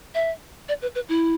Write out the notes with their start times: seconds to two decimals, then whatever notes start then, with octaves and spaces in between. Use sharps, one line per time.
0.14 E5
0.68 D5
0.82 B4
0.95 B4
1.09 E4